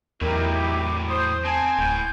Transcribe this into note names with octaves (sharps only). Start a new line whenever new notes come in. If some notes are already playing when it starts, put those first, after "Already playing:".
E2 A2 F#3 D#4 E4 G4 A#4
D6
C5 D#6
C4 G#5 A5
D1 A2 G6